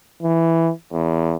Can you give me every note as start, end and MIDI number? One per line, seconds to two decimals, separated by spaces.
0.23 0.71 52
0.92 1.36 40